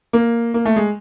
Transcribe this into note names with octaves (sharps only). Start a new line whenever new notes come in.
A#3
A#3
A3
G#3